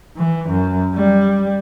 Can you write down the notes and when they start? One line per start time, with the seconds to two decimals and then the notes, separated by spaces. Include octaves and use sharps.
0.17 E3
0.49 F#2
0.95 G3